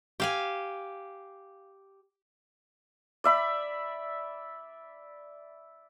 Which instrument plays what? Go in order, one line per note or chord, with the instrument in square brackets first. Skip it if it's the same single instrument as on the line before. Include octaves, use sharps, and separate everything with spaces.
[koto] G4 F5 G#5
[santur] D5 E5 B5